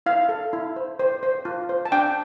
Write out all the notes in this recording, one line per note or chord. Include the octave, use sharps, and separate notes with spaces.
E4 F5
A4
E4
C5
C5
C5
F4
C5
A5
D4 G5